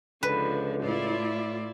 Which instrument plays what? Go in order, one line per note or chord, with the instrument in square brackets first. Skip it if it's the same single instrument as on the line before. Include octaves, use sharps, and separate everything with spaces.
[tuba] C#2 [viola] D3 F3 [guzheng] B4
[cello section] A2 F4 [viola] E4 D5